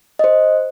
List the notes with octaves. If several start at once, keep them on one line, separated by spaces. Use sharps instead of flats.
D#5
C5